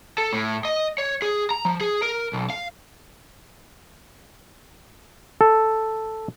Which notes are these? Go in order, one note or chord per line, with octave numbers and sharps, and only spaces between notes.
A4
A2
D#5
C#5
G#4
A#5
F3
G#4
A#4
B1
F5
A4